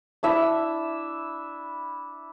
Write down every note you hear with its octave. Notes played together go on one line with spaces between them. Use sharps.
D4 E4 E5